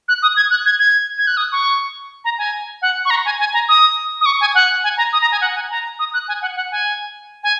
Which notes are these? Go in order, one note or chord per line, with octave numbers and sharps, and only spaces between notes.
F#6
D#6
G#6
F#6
G#6
G#6
G#6
F#6
D#6
C#6
A#5
G#5
F#5
C#6
A#5
G#5
G#5
A#5
D#6
D#6
C#6
G#5
F#5
G#5
A#5
D#6
A#5
G#5
F#5
G#5
A#5
D#6
F#6
G#5
F#5
F#5
G#5
G#5